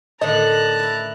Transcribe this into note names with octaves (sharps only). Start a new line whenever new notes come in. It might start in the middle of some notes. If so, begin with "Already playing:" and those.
A2 D3 D#3 D#5 A5 A#5 F#6
E4 E5